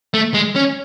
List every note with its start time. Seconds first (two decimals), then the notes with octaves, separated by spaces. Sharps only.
0.14 A3
0.34 G#3
0.56 C#4